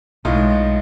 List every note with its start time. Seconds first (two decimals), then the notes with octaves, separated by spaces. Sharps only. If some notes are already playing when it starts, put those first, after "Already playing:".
0.25 B1 A2 G#3 D#4 F4